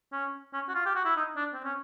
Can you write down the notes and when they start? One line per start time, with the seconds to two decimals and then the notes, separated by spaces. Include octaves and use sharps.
0.12 C#4
0.53 C#4
0.69 F#4
0.75 F4
0.86 G4
0.95 F#4
1.05 E4
1.17 D#4
1.36 D4
1.53 C4
1.64 C#4